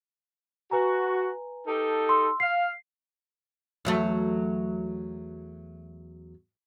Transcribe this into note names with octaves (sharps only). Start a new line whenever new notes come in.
F#4 B4 G#5 A#5
D#4 G4 A4
C6 E6
F5 C7
E2 F#3 A3